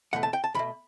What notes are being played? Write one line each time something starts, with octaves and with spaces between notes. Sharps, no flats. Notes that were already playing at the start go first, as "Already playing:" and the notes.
E2 B2 A3 F#5
A5
G5
A5
E2 B2 A3 B5